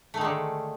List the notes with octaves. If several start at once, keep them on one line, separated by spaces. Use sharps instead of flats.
D3 D#3 G#3 A3